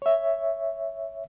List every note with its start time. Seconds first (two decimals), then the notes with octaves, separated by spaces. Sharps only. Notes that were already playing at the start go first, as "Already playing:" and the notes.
0.02 C#5 E5